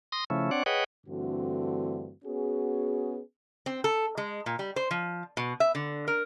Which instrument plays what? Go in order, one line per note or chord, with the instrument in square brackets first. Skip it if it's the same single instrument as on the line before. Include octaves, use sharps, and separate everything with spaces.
[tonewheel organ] C6 D#6 A#6
C#3 F3 A3 C#4 E4
C4 D4 C#5 D5 F#5
G#4 B4 C#5 D#5 F#5 G5
[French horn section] G2 D3 E3 A3 C4 F#4
B3 C#4 F#4 G#4
[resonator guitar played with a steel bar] C4
A4
G#3
A#2
G3
C5
F3
B2
E5
D3
A#4